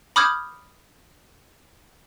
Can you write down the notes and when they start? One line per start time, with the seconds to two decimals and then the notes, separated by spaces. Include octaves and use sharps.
0.16 B5 D6 D#6 F6 G6 G#6